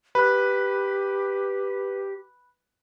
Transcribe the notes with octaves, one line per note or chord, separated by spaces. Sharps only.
G4 B4 B5 F#6